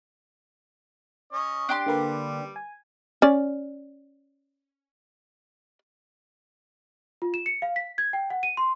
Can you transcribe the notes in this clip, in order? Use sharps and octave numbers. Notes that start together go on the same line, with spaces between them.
C#4 C#5 D#5
D4 G4 C6
D3 G3 A#3 B4
G#5
C#4 D5
F4
E7
C#7
F5
B6
G#6
G5
F#5
D#7
C6